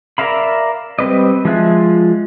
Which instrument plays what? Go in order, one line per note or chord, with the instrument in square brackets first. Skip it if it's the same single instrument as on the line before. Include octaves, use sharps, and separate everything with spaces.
[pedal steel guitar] A#4 D5 E5 F5 B5
G3 C4 B4 D#5
F3 G#3 F4 E5 F#6